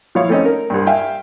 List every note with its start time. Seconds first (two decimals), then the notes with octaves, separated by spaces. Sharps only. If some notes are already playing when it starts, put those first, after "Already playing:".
0.15 F3 E4 C#5 F5
0.29 A3 C4 C#4 D#4
0.45 A#4
0.70 C2 G2
0.86 E5 F5 G5 G#5